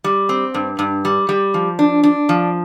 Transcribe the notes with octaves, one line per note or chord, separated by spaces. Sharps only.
G3
C4
G2
G2
G3
G3
F3
D4
D4
F3